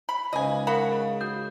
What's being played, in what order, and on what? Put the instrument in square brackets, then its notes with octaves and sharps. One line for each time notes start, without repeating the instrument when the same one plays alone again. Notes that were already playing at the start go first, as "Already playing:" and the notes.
[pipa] B5
[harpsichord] C#2 G#2 C#3 [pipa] D#5 G#5
[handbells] A#4 F5 C#6 [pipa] F#5 B5
[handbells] G#4
F#4 D#6 G6